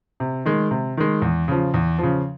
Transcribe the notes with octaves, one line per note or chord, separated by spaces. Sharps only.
C3
D#3 G#3
C3
D#3 G#3
E2
C#3 F3
E2
C#3 F3